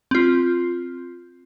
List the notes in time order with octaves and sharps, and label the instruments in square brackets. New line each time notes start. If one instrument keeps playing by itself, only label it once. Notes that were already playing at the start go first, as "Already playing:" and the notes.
[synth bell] C4 F4